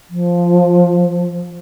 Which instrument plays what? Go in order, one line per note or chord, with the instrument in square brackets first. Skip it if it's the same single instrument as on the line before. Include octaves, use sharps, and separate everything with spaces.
[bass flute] F3